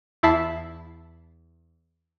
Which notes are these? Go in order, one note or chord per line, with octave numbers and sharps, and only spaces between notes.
E2 E4 E5 A5 B6 C7